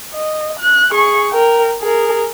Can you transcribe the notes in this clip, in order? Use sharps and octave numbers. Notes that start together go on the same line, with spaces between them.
D#5
F#6
G#4 C#6
A#4 G5
G#4 A#4